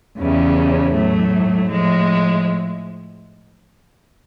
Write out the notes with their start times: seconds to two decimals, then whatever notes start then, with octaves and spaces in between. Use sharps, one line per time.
0.18 E2 C#3 E3 G3
0.94 A2 F#3 A3
1.71 A2 F3 G#3